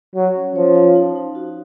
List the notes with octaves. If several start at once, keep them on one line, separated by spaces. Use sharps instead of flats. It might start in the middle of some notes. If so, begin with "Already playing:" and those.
F#3 C#5
C#4
F3 C#5
F5
D#4
D#4
F#4